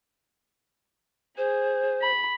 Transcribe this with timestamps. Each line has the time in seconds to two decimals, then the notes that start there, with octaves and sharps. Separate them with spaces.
1.38 G#4 C5
2.01 B5